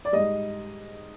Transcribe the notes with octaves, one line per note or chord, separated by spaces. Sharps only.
D5
G#2 G3 D#5